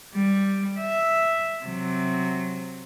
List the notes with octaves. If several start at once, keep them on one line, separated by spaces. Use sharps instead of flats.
G3
E5
C3 F#3